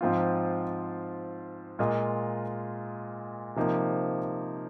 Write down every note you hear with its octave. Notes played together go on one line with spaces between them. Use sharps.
G#2 F3 C4 F4
A#2 G#3 F4 A#4 D#5
C3 F3 A#3 D#4